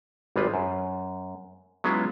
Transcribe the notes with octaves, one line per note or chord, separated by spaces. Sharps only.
G#1 G3 G#3 F4 B4
F#2
F#3 G#3 B3 C#4 E4 F4